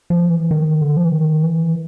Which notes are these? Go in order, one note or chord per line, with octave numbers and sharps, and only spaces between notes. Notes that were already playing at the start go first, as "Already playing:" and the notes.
F3
E3
D#3
D3
F3
E3
D#3
E3